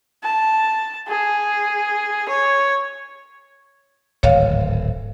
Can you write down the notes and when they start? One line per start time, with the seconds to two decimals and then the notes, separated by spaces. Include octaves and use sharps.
0.23 A5
1.08 G#4
2.28 C#5
4.23 D1 G#1 C#5 F5